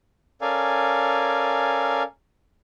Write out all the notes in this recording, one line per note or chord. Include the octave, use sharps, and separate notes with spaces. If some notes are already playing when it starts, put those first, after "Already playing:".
C#4 A4 A#4 D5 F5 G#5